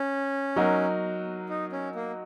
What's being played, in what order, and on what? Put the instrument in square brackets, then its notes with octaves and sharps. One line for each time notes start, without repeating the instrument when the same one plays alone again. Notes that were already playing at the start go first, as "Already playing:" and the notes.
Already playing: [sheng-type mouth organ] C#4
[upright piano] F#3 D#4 F#4 A#4
[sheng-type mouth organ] D#4
C#4
A#3